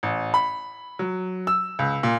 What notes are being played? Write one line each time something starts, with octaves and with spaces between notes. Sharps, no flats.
A1
B5
F#3
E6
C#2
A#2